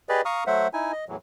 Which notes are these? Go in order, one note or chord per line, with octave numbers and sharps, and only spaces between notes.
G4 G#4 B4 D5 D#5
F5 A#5 C#6 D#6 F6
F#3 A3 C5 E5 F#5
D#4 E4 G#5
D#5
E2 A2 E3 F#3